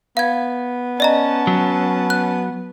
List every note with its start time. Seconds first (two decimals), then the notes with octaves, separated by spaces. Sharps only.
0.17 B3 F5 G#6
1.00 C#4 D5 D#5 A5 A#5
1.47 F#3
2.10 F#6